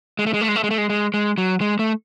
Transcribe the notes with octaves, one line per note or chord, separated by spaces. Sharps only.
G#3
A3
G#3
A3
G#3
A3
G#3
A3
G#3
G#3
G#3
F#3
G#3
A3